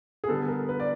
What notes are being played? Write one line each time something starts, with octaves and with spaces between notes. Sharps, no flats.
G#4
D3 G3 B3 A4
A#4
B4
D5